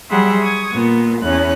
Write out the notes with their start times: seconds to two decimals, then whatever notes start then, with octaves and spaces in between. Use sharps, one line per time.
0.10 F#3 G3 G#4 E5 F#5 C6
0.42 C#6 D#6 G#6
0.72 A#2 B3
1.22 E2 C#4 F#6